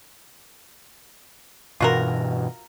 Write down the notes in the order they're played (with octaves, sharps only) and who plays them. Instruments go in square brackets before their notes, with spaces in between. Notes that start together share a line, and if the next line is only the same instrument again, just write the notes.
[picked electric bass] G2 B2 E3 [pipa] F4 F#4 A#4